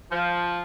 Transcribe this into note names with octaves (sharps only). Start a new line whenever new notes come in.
F3